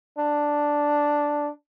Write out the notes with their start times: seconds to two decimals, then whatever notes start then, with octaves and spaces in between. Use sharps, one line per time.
0.18 D4